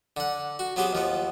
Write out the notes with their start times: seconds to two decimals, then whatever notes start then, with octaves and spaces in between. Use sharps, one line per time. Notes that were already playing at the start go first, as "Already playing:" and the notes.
0.17 D3 F#5
0.59 F#4
0.76 F#3 B3 C4 G4 G#4
0.93 D#2 F3 B3